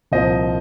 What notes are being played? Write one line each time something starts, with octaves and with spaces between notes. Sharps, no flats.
C2 A#2 F3 C5 D#5